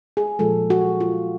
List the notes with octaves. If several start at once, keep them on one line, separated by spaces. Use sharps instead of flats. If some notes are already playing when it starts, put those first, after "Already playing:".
G#4
A#2 F3 G#3 A4
F#4
F4